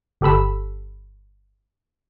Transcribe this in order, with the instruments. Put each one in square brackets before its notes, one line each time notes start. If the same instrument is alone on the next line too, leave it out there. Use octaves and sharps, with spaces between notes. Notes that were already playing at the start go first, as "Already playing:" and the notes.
[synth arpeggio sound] G1 G4 A4 B5 E6